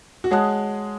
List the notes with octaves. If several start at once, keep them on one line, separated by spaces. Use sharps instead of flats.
F#4
G#3 G#4 C#5 F#5 A5 D#6 F#6